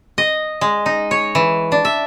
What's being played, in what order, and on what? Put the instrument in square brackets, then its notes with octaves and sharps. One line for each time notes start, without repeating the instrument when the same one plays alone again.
[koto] D#5
G#3
D#4
C#5
E3
D4
E5